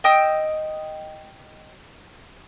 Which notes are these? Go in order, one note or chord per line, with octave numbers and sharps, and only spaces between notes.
D#5 G5 D#6 E6